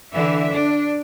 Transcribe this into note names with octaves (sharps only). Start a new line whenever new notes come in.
D3 E3 E5
D4